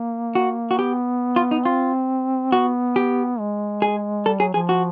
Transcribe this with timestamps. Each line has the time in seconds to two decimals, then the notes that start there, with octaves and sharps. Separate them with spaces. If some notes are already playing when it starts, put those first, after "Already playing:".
Already playing: A#3
0.35 F#4
0.71 F#4
0.78 B3 G4
1.36 F4
1.51 D#4
1.65 C4 F4
2.52 B3 F#4
2.96 G4
3.39 G#3
3.82 G#4
4.26 G3 A4
4.39 F#3 G#4
4.54 F3 G#4
4.69 F#4